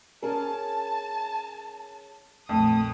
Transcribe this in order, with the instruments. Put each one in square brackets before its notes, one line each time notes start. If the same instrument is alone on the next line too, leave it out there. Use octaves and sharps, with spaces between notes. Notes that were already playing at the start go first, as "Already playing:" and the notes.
[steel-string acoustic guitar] C#4 G#4 A#4 [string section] A5
[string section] A#1 D#6 [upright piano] F2 [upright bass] A3